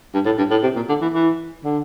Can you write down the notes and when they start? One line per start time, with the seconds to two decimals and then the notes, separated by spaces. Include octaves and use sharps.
0.14 G2
0.25 A2
0.38 G2
0.51 A2
0.63 C3
0.76 A#2
0.89 D3
1.02 E3
1.14 E3
1.64 D3